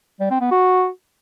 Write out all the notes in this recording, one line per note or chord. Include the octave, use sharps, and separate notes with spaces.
G3
C4
B3
F#4